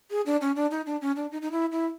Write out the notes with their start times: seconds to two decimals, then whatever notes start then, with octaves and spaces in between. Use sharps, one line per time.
0.11 G#4
0.26 D4
0.41 C#4
0.56 D4
0.71 D#4
0.86 D4
1.01 C#4
1.16 D4
1.32 D#4
1.42 D#4
1.52 E4
1.72 E4